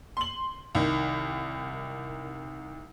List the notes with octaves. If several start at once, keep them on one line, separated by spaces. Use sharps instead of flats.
C6 F#7
C2 D#3